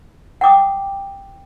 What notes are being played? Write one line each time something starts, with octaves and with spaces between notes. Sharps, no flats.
F#5 G5 D6 D#6